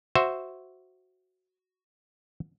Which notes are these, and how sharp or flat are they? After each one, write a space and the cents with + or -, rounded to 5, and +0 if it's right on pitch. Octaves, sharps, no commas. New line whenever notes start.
F#4 +0 C5 +0 E5 +0